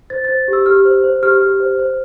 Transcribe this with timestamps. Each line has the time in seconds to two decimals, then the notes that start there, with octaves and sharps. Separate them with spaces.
0.10 C5 A6
0.25 C5 A6
0.48 G4
0.53 E6
0.66 G4 F6
0.85 C5
1.04 C5
1.23 G4 F6
1.41 G4
1.60 C5
1.79 C5